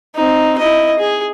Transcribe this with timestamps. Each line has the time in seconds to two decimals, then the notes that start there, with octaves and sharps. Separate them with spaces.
0.15 C4 D#4
0.58 E4 D#5
0.99 G#4